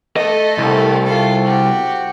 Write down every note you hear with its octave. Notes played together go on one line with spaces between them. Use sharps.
A3 A4 D#5
C2
F4 A4
F#4 G4